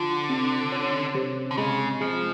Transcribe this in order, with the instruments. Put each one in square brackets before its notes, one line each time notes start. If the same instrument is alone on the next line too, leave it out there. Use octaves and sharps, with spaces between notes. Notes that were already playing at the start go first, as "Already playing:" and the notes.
Already playing: [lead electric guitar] D3 [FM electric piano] F3
[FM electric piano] C3
C#4
C3
[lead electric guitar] D3
[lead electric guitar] C#3 [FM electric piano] G#3
[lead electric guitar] F3 [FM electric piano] G#3